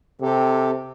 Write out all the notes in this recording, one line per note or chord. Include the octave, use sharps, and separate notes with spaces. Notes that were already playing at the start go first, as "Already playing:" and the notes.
C3 C4 G4 A4